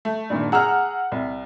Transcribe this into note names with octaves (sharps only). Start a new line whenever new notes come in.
A3
G2 A#2 D#3
G#4 F#5 A#5 E6 F6
C2